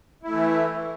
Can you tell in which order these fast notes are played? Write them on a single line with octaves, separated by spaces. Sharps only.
E4 A3 E3